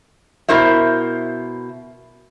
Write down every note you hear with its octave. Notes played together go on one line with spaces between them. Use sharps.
B2 E4 A#4 C5 E5